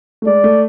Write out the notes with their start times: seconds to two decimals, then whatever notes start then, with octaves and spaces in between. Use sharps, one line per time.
0.22 A3
0.26 G#3 D5
0.44 A3